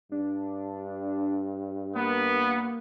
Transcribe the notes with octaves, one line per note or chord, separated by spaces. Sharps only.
G2 D4
A#3 B3